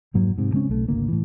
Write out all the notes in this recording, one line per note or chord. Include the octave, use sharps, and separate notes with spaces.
F1 G#2 F#3 A#3
G#2 C3
C#3 G#3 C4 C#4
B1 A3
G#1 D2 C#3 A#3
A2 E3